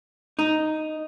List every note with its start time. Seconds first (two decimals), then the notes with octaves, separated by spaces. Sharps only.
0.39 D#4